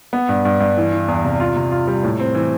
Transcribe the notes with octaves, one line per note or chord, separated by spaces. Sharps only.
B3
G2
G2
G2
E3
E3
E2
C3
F4
C3
F4
G3
A2
C4
E3